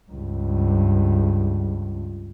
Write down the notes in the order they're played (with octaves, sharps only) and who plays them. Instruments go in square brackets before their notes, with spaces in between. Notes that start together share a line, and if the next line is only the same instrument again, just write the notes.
[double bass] C#2 G2